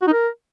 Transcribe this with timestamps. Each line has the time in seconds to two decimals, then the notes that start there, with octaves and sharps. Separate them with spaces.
0.02 F#4
0.07 D#4
0.13 A#4